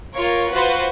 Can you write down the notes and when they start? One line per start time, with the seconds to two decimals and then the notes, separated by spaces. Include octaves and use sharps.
0.15 F4 A#4 C#5
0.53 F4 F#4 B4 C5